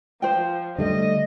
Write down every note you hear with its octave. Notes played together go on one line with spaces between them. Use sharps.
F3 C5 G5
D3 G3 A3 D#5